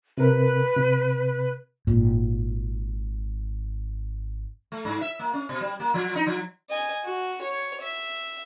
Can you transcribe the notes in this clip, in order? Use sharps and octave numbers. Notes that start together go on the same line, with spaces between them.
C3 A#4 B4
C3
G#1 A#2
A3
G#2
E5
A#3
C#4
B2
G3
A#3
F3
D#4
F3
D#5 G#5
F#4
C#5
E5